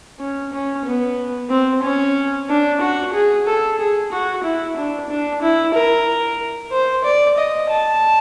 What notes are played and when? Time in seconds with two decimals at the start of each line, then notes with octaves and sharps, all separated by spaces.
0.20 C#4
0.53 C#4
0.86 B3
1.50 C4
1.83 C#4
2.49 D4
2.81 F#4
3.13 G#4
3.47 A4
3.78 G#4
4.12 F#4
4.43 E4
4.76 D4
5.09 D4
5.42 E4
5.74 A#4
6.72 C5
7.04 D5
7.37 D#5
7.70 A5